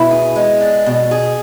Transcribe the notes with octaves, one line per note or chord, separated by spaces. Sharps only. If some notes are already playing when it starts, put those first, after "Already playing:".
Already playing: B2 E4
G#4
G#3
D4
B2
G#4